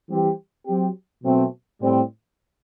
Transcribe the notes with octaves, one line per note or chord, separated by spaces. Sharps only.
E3 G3 C4 G4
F#3 C4 G4
B2 F#3 A3 C4
A2 G3 C4